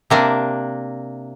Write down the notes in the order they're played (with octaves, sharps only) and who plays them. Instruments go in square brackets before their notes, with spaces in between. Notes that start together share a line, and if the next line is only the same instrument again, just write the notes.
[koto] C3 A#3 D4